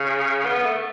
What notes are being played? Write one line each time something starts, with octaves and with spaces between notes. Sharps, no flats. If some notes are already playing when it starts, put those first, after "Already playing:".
Already playing: C#3
B3
A3